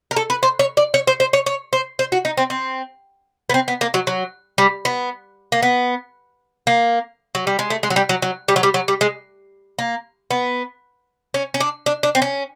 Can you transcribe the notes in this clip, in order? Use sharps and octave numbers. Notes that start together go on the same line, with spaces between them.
A#4
A4
B4
C5
C#5
D5
C#5
C5
C5
C#5
C#5
C5
C5
F#4
D#4
C4
C4
B3
C4
B3
A#3
F#3
F#3
G3
B3
A#3
B3
A#3
F#3
G3
G#3
A3
G#3
F#3
G3
F#3
F#3
G3
F#3
G3
F#3
G3
G#3
A#3
B3
C#4
C#4
D4
D4
D4
C4
C#4